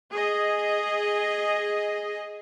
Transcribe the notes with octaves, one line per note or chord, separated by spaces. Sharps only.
G#4 D#5